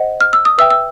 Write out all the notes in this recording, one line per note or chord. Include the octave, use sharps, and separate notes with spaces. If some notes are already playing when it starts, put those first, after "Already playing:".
Already playing: C5 D#5 F#5
F6
E6
D#6
B4 E5 G5 E6
E6